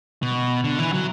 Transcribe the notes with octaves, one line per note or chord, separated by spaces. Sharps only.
B2
D3
E3
F#3